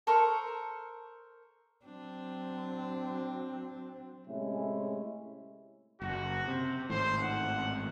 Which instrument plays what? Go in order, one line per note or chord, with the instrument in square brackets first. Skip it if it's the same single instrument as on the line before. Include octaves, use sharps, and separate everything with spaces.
[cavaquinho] A4 A#4 C5 C#6
[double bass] F#3 C4 [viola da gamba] D4
[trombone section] A2 C3 G#3 C#4 E4
[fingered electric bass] F#1 [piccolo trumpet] F#4
[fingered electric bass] C3
[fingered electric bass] G#1 A2 [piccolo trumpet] C5
[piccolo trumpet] F#5